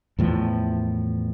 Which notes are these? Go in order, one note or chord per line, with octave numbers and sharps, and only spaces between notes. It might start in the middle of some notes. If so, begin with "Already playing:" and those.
E2 A2 F3